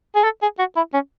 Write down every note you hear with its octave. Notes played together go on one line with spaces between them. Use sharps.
G#4
A4
G#4
F#4
E4
C#4